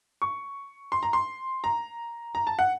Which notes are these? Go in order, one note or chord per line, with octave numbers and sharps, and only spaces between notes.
C#6
C6
A#5
C6
A#5
A#5
A5
F#5